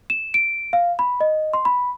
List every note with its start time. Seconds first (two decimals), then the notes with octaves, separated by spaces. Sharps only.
0.10 E7
0.34 D7
0.73 F5
0.99 B5
1.21 D#5
1.53 C6
1.65 B5